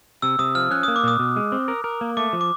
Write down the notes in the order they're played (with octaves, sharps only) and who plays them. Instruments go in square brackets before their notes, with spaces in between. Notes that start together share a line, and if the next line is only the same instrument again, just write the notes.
[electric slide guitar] C3 [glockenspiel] E6
[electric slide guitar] C3 [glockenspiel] D#6
[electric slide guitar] F3 [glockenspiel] F6
[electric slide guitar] C#4 [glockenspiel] F#6
[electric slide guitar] A#3 [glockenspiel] D#6
[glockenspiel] D6
[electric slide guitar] A#2 [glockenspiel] D#6
[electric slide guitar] B2
G#3
C4
A#4
A#4
A#3
[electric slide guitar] A3 [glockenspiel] D6
[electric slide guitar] F3
[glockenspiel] D6